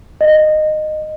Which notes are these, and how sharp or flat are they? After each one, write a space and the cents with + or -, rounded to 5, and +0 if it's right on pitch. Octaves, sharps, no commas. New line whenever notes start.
D#5 -15